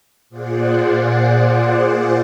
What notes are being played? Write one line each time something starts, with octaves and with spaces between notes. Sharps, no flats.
A#2 F4 G#4 C5 D5 F#5